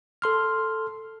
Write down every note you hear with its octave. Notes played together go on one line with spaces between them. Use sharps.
A4 C6 F6